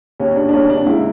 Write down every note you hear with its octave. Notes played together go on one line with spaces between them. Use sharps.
D#2 C#4
D#2 D4
D4
D#2 C#4
D#2 D4
C#2 E4